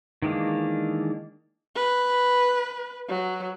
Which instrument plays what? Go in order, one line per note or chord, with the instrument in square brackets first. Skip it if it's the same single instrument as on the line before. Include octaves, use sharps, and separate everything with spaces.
[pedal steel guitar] D#3 E3 G#3 A#3 D4
[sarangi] B4
F#3